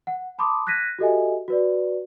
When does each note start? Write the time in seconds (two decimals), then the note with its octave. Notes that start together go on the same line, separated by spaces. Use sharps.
0.07 F#5
0.38 A5 B5 C6 D6 D#6
0.67 F#6 G#6 A#6 B6 D#7
0.99 F#4 G4 A4 D#5 E5 G#5
1.48 F#4 B4 D5